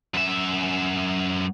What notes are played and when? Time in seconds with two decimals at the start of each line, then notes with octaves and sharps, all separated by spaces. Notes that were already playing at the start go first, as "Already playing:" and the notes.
0.14 F#2 E5